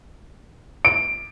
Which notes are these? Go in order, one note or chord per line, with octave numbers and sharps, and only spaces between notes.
D7